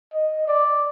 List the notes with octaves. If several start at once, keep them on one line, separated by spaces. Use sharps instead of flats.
D#5
D5